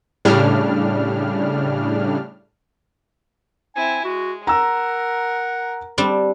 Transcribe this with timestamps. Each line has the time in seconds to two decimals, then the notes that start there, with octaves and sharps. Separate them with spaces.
0.25 A2 C#3 G3 D4 F6
3.76 C4 E4 G#5
4.04 G#3 F#4
4.47 A#4 F#5 A#5 E6
5.98 G3 C4 D4